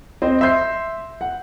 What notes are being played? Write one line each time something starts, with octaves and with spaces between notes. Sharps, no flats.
C4 C5 D#5
E5 C6 G6 C7
F#5